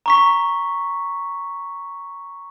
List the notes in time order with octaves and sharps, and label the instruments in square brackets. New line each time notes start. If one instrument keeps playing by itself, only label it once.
[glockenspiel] A#5 C#6 B6